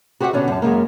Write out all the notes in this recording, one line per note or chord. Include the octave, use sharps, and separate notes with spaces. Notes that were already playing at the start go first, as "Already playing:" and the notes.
F#4 G4 C5 C#5 E5 F#5
B2 D3 C#4 D4
F#2 A5
F#2 C#3 G#3 A#3